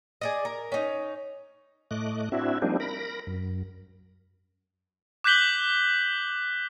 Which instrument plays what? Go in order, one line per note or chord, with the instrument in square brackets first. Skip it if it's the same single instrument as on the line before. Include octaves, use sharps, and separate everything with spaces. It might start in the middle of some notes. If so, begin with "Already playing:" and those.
[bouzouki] G#4 D5 D#5
A#4
C#4 D#4
[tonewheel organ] A2 A3 D#5 D6 F#6
C4 D4 E4 F#4 E5
F3 G3 A#3 C4 D4 D#4
A#4 B5 A#6
F#2
[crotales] D6 F#6 G6 B6 F#7 G7